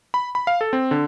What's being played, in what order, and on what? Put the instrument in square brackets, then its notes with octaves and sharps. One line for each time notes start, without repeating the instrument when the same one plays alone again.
[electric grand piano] B5
B5
F5
A4
C4
D3